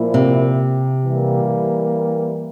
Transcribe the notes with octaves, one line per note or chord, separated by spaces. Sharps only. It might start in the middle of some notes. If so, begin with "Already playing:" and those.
Already playing: A#2 F3 A#3 E4
C3
E3 G3 A#3